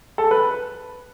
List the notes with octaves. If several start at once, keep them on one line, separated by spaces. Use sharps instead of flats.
A4
B4